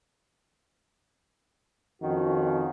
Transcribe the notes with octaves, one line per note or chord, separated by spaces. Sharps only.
F2 D#3 C#4 F#4